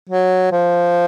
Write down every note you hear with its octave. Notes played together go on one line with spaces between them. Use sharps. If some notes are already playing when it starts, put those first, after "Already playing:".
F#3
F3